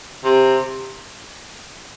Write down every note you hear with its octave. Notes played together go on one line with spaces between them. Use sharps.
C3